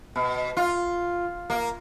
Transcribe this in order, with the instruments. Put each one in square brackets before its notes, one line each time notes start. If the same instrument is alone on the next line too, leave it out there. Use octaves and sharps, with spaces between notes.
[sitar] B2
F4
A#3